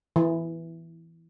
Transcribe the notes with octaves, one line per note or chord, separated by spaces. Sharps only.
E3